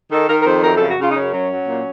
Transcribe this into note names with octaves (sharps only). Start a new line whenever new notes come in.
D#3 A4
D#3 A#4
A#4
F2 C5
F#2 A#4
C#3 A4
F#4
C#3 F4
D#4
F#2 C#4
F#3
F#3
A#2